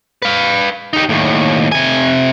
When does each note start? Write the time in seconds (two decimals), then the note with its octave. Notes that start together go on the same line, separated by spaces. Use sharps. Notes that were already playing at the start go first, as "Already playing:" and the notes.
0.22 B4 F5
0.93 D#4 G4
1.09 D#2 A2
1.72 C3 G#5